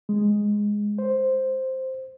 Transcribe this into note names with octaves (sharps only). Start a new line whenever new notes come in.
G#3
C5